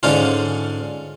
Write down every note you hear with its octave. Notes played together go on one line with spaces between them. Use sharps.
G#2 D3 C#4 F4